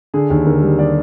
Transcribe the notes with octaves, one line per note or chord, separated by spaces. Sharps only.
D3 G#4
D#2
D3 A#4
G3
G3 D5